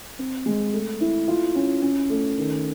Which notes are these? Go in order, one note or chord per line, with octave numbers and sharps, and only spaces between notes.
C4
G#3
A3
E4
F4
C#4
C#4
A3
D#3